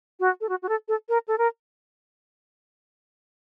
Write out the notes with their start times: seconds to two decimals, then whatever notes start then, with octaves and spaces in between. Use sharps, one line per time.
0.20 F#4
0.41 A4
0.49 F#4
0.63 F#4
0.69 A4
0.88 A4
1.09 A#4
1.28 A4
1.38 A#4